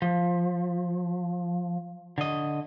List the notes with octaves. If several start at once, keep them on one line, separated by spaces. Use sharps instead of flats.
F3
D3 D#5